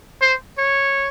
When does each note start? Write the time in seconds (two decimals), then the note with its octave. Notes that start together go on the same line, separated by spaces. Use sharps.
0.22 C5
0.58 C#5